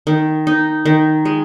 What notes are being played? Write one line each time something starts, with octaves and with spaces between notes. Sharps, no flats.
D#3
D#4
D#3
G#3